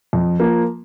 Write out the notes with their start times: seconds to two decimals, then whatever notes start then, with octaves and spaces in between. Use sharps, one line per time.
0.13 F2
0.40 F3 A#3